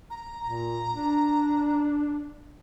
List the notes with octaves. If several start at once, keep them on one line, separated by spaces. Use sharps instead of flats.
A#5
A#2 A#5
D4